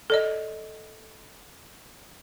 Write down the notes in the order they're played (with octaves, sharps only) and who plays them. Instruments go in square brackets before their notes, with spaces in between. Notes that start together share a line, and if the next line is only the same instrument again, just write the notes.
[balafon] A4 D5 D#5